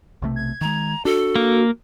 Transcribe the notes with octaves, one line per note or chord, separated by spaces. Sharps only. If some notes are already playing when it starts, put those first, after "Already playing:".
B1 C3 A3
G#6
D#3 G#3 A#5
D4 F#4 A4
A#3